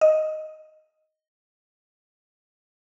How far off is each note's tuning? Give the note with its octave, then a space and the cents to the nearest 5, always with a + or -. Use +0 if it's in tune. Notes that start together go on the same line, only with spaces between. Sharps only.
D#5 +0